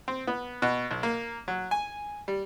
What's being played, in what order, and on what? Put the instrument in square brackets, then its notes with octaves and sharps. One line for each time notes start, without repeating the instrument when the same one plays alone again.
[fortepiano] C4
B3
B2
B1
A#3
F#3
G#5
G3